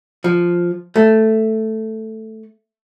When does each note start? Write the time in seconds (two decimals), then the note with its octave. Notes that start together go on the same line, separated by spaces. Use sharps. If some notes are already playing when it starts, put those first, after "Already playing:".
0.24 F3
0.96 A3